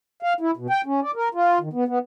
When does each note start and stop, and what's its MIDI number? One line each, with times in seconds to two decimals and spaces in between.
0.23 0.33 77
0.41 0.51 64
0.57 0.67 47
0.70 0.81 79
0.86 1.00 61
1.03 1.11 74
1.16 1.28 70
1.35 1.58 65
1.61 1.69 51
1.73 1.84 59
1.88 1.99 59